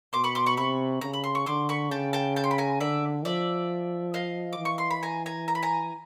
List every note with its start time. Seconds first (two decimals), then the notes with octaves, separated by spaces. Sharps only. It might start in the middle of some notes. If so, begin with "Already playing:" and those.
0.13 B2 C6 D6
0.24 B5 C#6
0.35 C6 D6
0.46 B5 C#6
0.57 C3 B5 C#6
1.01 C#3 A#5
1.13 B5
1.24 C6
1.35 C#6
1.46 D3 C6 D6
1.69 B5 C#6
1.91 C#3 G5 A5
2.13 G5 A5
2.36 G5 A5
2.44 C6
2.51 B5
2.58 G#5 A#5
2.80 D3 D5 E5
3.25 F3 D5 E5
4.14 D#5 F5
4.53 D6
4.59 E3
4.65 C#6
4.78 C6
4.91 B5
5.03 G#5 A#5
5.26 G#5 A#5
5.48 A#5
5.55 B5
5.62 G#5 A#5